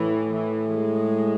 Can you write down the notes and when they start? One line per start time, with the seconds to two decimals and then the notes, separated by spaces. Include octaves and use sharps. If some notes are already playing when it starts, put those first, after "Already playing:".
Already playing: A2 E3
0.33 E3
0.75 G#3